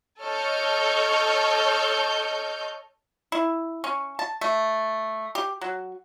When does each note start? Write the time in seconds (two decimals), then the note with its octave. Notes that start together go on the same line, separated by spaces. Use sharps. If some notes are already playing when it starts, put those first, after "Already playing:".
0.20 A4 C#5 D#5 C#6 F6 G6
3.32 E4
3.84 C#4
4.19 A5
4.41 A3
5.35 G4
5.61 F#3